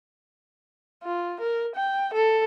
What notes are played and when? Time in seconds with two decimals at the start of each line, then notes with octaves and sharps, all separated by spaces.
1.03 F4
1.41 A#4
1.76 G5
2.14 A4